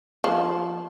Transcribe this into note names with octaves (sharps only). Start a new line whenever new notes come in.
F3